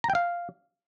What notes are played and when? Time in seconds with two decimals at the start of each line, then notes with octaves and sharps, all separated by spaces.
0.04 A#5
0.10 G5
0.15 F5